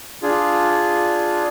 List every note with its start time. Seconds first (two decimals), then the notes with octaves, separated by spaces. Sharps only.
0.23 D4 F4 G#4